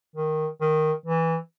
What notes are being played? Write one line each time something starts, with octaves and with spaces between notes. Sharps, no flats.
D#3
D#3
E3